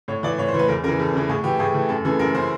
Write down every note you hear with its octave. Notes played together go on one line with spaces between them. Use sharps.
A2 C#5
E3 D5
A2 C#5
C5
E3
B4
E2 A#4
C#3 E3 A#4
E2 A4
C#3 E3
A2 G#4
E3 G4
A2 G#4
E3 A4
F#2 A4
C#3 E3 A4
F#2 A#4
C#3 E3 C5